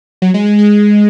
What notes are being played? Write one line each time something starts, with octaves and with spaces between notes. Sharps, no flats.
F#3
G#3
G#3
G#3